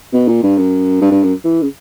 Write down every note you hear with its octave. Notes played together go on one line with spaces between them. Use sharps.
B2
A#2
G2
F#2
G2
G2
F#2
E3
C#3